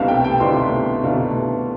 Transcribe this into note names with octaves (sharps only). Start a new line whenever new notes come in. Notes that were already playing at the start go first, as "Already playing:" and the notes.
Already playing: C2 B2 A3 D4 E5 F5
G5
G5
C2 B2 A3 D4 C6
C2 B2 A3 D4 F5